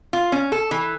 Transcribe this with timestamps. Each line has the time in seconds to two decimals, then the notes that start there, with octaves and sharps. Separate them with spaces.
0.13 F4
0.32 C#4
0.52 A4
0.71 E3